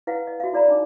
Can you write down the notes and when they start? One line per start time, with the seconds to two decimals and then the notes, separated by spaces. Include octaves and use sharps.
0.07 E4 B4 F5 F#5
0.27 D#5
0.40 F#4 E5 F5
0.53 E4 G#4 D5 F5 A#5 B5
0.68 D4 D#4 D6